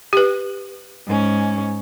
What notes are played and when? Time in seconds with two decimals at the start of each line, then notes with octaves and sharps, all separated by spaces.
0.13 G4 B4
1.07 G#2 C#4